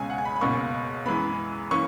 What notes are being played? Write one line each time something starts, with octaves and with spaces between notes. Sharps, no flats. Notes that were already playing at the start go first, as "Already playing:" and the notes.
Already playing: C#2 B2 G#3 C#4 G#5
F#5
G#5
B5
B5
C#2 B2 A#3 C#4 C#6
F#2 E3 G#3 B3 B5
E3 A#3 C#4 C#6